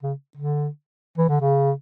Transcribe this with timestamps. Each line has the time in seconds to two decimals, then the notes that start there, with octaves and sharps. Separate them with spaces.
0.03 C#3
0.37 D3
1.18 E3
1.29 D3
1.41 C#3